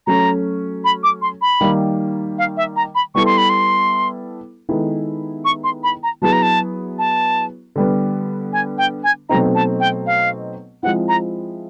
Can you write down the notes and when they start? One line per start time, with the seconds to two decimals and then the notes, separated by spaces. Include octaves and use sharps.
0.07 F#3 A3 C#4 A#5
0.84 B5
1.04 D6
1.22 C6
1.42 B5
1.61 D#3 G3 A#3
2.38 F5
2.57 E5
2.76 A#5
2.95 B5
3.15 G3 B3 E4 A4 C#6
3.26 C6
3.38 B5
3.50 C6
4.69 D#3 G#3 B3 E4 A4
5.45 C#6
5.64 C6
5.83 B5
6.03 A#5
6.22 F#3 B3 E4 G#4 A5
6.32 A#5
6.43 A5
6.99 A5
7.76 D3 G3 B3
8.53 G#5
8.78 G5
9.04 G#5
9.29 B2 F#3 A3 C4 D#4 A#5
9.55 A5
9.80 G5
10.06 F5
10.83 F3 G#3 C4 E4 F#5
11.08 A#5